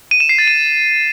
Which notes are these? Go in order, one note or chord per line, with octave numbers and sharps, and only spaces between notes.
D#7
E7
C7
A6
D#7